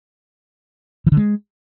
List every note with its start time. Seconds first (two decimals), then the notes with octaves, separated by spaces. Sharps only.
1.07 E3
1.12 D3
1.17 G#3